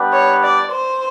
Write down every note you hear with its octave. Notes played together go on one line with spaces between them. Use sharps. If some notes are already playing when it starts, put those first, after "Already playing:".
Already playing: G3 B3 D4 G4 B4
C#5
D5
C5